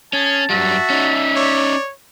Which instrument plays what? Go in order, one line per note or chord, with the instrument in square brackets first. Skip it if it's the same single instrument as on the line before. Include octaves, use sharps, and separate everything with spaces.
[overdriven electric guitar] C#4 [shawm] G#4 [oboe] A5
[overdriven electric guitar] F#2 G3 [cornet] F#4 [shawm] E5
[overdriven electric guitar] C#4 D#4
[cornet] C#5 [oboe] D5